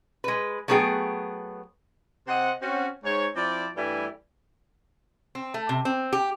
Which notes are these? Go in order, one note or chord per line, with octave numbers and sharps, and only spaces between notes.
G#3 B4
F#3 A3 B3 D4 G#4 G5
C3 C4 C5 D#5 F#5
C4 C#4 F#4
G#2 C#5
F3 C4 E4 D5
G2 E3 G3 A3 E5 G#5
C4
A3
C3
C4
G4